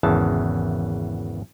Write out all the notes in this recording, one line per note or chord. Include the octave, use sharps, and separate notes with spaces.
G#1 E2 C#3 E3 A5